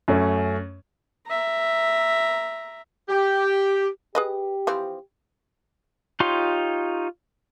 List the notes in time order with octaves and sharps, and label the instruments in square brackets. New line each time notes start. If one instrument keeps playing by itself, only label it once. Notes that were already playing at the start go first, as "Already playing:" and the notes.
[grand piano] F#2 A3 C#4
[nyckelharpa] E5 A#5
[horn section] G4
[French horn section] G4 [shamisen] G#4 B4 D#5
[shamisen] E3 F3 C4
[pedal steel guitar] D#4 F4 G4 C#5 C6